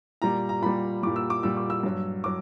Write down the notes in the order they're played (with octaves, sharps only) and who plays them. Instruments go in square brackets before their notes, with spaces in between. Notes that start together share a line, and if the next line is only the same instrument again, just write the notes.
[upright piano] A#2 G3 A#5
A#5
A#2 G3 B5
A#2 G3 D6
E6
D6
A#2 G3 E6
D6
E6
G2 F#3
F#3 D6